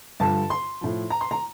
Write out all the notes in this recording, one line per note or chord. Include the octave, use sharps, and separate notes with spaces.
G2 D3 F3 A5
C6
A2 F3
A#5
C6
A#5